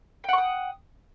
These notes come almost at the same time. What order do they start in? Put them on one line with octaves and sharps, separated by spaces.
G5 F#5 C#6 D#6